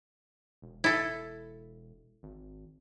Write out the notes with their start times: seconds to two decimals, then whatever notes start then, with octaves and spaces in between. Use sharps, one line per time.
0.62 E1
0.84 E4 A4
2.23 G#1